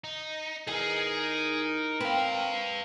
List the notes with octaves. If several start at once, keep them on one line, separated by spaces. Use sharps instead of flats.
D#4
E2 D#4 G#4 A#4 G#5
C4 B4 F5